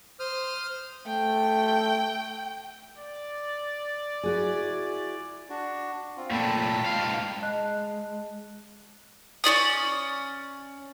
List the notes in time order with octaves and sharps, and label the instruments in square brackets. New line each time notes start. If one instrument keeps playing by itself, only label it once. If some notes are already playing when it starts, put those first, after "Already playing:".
[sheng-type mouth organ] C5 D#6 F6
[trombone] A3 [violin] G5
[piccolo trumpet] D5
[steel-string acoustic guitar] E4 F#4 G#4
[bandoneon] D4 F#4
C4 F4
[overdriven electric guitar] A#2 A3 [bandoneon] G5 A5 B5
[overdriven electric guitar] G#2 F5
[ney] G#3 [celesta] D#5 A5 F#6
[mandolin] C#4 F#4 D5 D#6